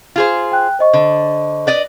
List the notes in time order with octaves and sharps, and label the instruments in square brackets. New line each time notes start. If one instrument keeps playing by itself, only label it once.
[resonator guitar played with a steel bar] F4 G#4 C5
[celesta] G5 F#6
C5 D#5 C#6
[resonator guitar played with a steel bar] D3
B4 D5 D#5